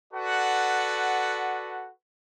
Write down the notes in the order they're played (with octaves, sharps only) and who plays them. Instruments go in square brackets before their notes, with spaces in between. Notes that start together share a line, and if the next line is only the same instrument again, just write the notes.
[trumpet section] F#4 A4 B4 D5 F#5